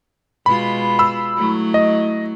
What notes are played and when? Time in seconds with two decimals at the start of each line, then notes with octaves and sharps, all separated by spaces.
0.46 B2 G#3 F4 B5
0.99 B5 E6
1.37 F#3 A3 E4
1.74 D#5